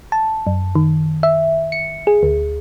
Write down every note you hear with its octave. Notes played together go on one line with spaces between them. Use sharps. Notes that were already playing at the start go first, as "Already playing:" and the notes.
A5
F#2
D#3
E5
C#7
G#4
D2